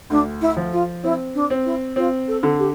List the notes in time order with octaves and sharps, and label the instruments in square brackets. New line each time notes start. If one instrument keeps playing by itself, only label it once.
[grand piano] D2 [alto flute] D4
[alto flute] E4
[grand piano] F3
[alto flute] F4
[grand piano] C4 [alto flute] E4
[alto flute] D4
[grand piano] C4
[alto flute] E4
[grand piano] C4 [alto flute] F4
[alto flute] A4
[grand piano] D3
[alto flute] G4